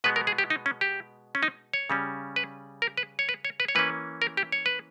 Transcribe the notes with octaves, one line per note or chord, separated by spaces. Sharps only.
B2 G#3 B3 B4
A#4
G#4
G4
D#4
C#4
G4
C#4
D#4
C#5
C#3 G3 C#4
B4
A#4
B4
C#5
B4
C#5
B4
C#5
E3 A#3 C#4 B4
A#4
G4
C#5
B4